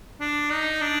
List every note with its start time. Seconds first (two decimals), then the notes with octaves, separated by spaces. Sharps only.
0.20 D4
0.51 D#4
0.81 D4